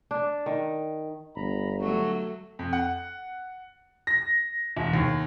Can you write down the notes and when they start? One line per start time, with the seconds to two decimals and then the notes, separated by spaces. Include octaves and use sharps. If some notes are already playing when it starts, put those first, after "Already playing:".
0.11 D4
0.46 D#3
1.36 G1 A#5 B5
1.80 F#3 A3 F#4
2.59 F2
2.73 F#5
4.07 A#6
4.77 E1
4.94 D#2